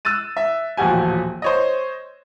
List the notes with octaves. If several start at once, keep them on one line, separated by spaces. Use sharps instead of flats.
E6 F#6 A6 D#7
E5
D#1 A1 F3 F#4 G4 G#5
C5 C#5 D#5